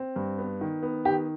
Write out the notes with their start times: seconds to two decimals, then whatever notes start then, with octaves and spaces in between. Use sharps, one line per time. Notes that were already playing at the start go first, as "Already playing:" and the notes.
Already playing: C4
0.16 G2
0.38 B3
0.61 D#3
0.83 B3
1.05 D#3 G4